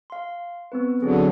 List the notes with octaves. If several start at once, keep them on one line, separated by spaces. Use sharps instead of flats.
F5 C6
B3 C4 B4
D3 F#3 C4 G#4